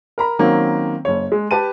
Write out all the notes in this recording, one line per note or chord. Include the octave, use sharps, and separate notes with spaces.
A#4 A#5 B5
D#3 F#3 A#3 C4 C#4
F#1 C#5
G#3
G4 B4 A5 D#7